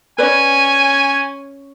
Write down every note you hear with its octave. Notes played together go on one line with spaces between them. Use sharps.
C#4 B4 D5 G#5